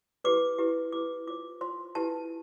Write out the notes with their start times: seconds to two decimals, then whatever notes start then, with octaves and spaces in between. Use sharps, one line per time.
0.24 E4 G4 B4 D6
0.59 E4 G4 B4
0.92 E4 G4 B4 D6
1.27 F4 C5 D6
1.61 F4 C5 C6
1.95 E4 G4 B4 A5